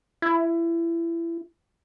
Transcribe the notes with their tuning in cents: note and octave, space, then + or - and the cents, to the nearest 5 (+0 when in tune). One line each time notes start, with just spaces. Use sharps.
E4 +25